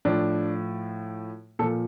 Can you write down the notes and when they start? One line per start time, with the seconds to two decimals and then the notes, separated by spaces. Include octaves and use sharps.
0.05 A2 F3 D4
1.59 A#2 A4
1.62 F3